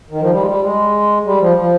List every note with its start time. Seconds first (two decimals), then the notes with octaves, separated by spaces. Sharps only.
0.11 D#3
0.21 F3
0.30 G3
0.40 G#3
0.47 G3
0.62 G#3
1.25 G3
1.40 F3
1.56 F3